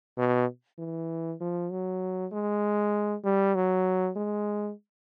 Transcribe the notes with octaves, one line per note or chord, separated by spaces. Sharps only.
B2
E3
F3
F#3
G#3
G3
F#3
G#3